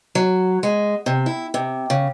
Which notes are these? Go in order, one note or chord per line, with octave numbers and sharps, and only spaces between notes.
F#3
G#3
C3
E4
C3
C#3